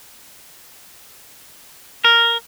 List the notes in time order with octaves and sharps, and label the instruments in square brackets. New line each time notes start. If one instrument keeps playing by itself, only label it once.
[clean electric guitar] A#4